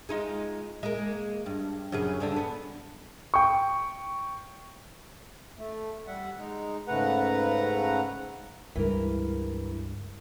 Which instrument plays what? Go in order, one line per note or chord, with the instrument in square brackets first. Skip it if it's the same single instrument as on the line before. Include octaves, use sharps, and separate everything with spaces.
[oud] G#3 D#4 F4
G#3 A#3
G2
F#2 C#3 G#4
G2 D3 D4
B3
[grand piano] G5 C#6
[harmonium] A3
G3 E5 F#5
G#3 D#4
G#2 C#3 A3 B4 F#5 A#5
[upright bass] C#2 G2 [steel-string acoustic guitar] E3 A#4